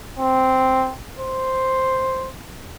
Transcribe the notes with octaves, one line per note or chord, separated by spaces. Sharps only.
C4
C5